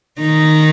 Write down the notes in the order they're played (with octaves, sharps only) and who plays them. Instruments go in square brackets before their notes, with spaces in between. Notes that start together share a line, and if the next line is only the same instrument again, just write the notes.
[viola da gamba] D#3 D#4